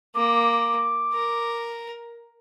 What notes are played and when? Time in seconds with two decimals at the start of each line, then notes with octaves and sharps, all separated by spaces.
0.15 A#3 D6
1.14 A#4